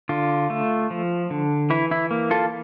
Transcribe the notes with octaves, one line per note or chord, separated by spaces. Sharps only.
D3 F4
A3
F3
D3
E3 E4
E4
A#3
F4 A4